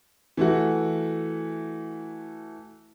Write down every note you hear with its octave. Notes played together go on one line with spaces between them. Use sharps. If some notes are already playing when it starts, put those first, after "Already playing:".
E3 A3 F#4